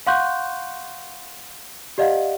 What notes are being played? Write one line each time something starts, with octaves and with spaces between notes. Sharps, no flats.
F5 F#5 C6 C#6 F#6 G6
G4 D5 D#5 F5 F#5